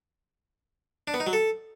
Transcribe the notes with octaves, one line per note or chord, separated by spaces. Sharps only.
D4
B3
D#4
F#3
A4